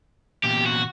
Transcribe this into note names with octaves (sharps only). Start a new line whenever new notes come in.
E2 A#2 G4
F#4